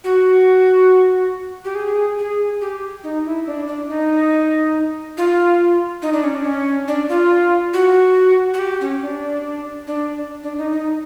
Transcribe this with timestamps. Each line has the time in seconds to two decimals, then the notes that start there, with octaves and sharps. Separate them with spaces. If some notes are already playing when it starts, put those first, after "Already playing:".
0.04 F#4
1.65 G4
1.75 G#4
2.19 G#4
2.61 G4
3.04 D#4
3.25 E4
3.47 D4
3.67 D4
3.88 D#4
5.17 F4
6.02 D#4
6.13 D4
6.24 C#4
6.34 D4
6.45 C#4
6.88 D4
7.09 F4
7.73 F#4
8.54 F#4
8.59 G4
8.81 C#4
9.02 D4
9.87 D4
10.43 D4
10.58 D#4
10.72 D#4